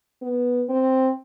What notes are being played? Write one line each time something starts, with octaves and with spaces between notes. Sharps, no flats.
B3
C4